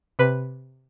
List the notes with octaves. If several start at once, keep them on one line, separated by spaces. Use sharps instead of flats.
C3 B4